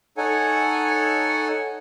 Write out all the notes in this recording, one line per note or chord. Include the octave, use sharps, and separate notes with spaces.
D#4 A4 C#5 F#5 G#5